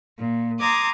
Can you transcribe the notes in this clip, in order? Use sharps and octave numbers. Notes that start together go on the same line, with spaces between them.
A#2
A#5 C6 D6 D#6 G#6